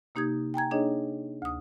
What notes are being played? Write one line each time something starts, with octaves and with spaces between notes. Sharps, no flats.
C3 A#3 D#4 G4 D#6 G#6
G5 G#5 A#5 G#6
A#3 D4 D#4 G#4 C#5 D#5
D2 D#6